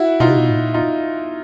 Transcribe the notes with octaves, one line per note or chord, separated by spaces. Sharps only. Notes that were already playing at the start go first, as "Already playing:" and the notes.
Already playing: E4 F#4
B2 D#4 F4
C3
B2
A2
A#2
D#4 F4